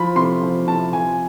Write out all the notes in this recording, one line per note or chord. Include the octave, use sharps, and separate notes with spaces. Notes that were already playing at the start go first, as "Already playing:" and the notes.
Already playing: F3 B5
C3 C6
F3
C3 A5
F3 G#5